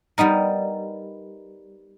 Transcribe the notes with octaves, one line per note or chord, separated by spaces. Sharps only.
G3 B3 D#4 A#4